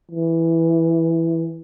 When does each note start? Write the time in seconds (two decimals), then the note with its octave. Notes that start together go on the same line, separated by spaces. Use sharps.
0.11 E3